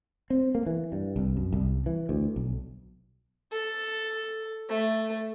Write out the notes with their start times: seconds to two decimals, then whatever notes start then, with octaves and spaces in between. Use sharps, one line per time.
0.30 C4
0.55 A#3
0.66 E3
0.92 G2
1.16 C2
1.37 F#2
1.52 C2
1.86 E3
2.09 D2
2.36 B1
3.52 A4
4.69 A3